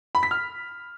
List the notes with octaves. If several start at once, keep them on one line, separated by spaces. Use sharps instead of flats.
B5
B6
F6